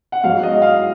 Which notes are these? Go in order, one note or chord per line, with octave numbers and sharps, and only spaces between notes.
F#5
G#2 F#3 F5
D#5
F5